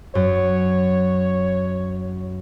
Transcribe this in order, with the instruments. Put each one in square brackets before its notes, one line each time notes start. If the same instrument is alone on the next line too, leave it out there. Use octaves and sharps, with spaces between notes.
[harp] F#2 [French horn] C#5